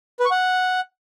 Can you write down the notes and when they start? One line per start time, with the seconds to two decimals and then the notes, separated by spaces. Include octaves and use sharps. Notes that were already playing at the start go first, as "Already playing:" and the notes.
0.20 B4
0.25 C#6
0.31 F#5